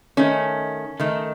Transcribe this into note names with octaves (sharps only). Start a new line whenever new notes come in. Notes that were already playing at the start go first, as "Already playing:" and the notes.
D#3 A3 C#4
D#3 A3